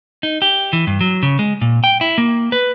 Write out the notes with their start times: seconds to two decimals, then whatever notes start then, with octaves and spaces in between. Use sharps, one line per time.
0.23 D#4
0.42 G4
0.73 E3
0.87 G2
1.01 F#3
1.23 C#3
1.39 G#3
1.61 A#2
1.84 G5
2.01 E4
2.18 A#3
2.52 B4